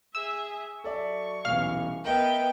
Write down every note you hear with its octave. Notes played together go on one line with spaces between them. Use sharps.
G#4 E5 E6
F#3 A4 D5 E5 C#6
D#1 B1 E3 F5 F6
B3 A#4 B4 D#5 E5 G5